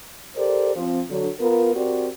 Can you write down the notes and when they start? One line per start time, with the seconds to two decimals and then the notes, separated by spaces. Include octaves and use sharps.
0.36 G4 A4 A#4 C5 D5
0.75 F3 C4
1.09 D3 F#3
1.40 B3 F4 A#4
1.75 C4 F#4 G4 A#4 D5